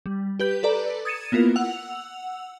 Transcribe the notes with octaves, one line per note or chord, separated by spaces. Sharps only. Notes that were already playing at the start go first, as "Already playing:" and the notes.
G3
G4 B4 G6
A4 B4 D5 A#5
D#6 G#6 A6 C#7 D#7 E7
A#3 B3 E4 F4 A#4
F#5 E6 F7